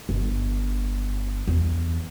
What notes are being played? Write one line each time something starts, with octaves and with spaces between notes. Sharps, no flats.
G1
E2